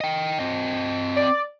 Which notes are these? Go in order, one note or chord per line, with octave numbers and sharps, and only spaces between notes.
D#5 G5
C4 D#5
D5